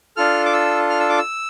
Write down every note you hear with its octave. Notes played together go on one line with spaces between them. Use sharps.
D4 F4 A4 F6
D6
E6
F6
E6
D6
E6